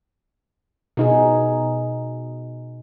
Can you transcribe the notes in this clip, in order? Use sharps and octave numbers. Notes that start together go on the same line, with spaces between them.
B2 D#4 G#4